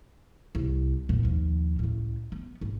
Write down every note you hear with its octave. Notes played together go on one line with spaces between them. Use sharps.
C2
F2 A#2
D#2 F3
C#2 A2
B3
G#1